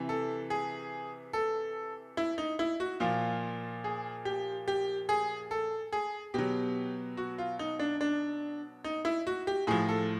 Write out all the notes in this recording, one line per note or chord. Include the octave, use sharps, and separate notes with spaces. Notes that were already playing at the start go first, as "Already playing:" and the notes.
Already playing: C3 E3
A4
G#4
A4
E4
D#4
E4
F#4
A#2 F3 F4
G#4
G4
G4
G#4
A4
G#4
B2 F#3 G4
F#4
F4
D#4
D4
D4
D#4
E4
F#4
G4
A2 F3 G#4
A4